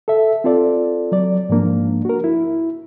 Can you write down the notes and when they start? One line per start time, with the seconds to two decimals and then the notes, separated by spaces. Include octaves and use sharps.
0.08 A4 E5
0.44 C4 F4 A4 D5
1.12 F#3 D5
1.49 G#2 F3 A#3 D4
2.05 F#4 A#4
2.24 E4